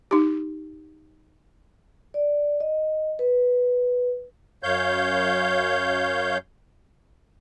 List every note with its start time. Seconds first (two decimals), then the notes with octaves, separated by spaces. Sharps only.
0.11 D#4 G4
2.14 D5
2.60 D#5
3.19 B4
4.63 F#2 C#5 F5 G6